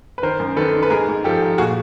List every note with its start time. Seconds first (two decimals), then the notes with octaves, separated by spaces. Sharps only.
0.18 B4
0.23 D#3 A#4 C5
0.40 F#2
0.56 D#3 A4 B4
0.74 D#3
0.83 B4
0.90 G#2 G#4 A#4
1.08 G#2
1.24 F3 G4 A4
1.42 F3
1.58 A#2 F#4 G#4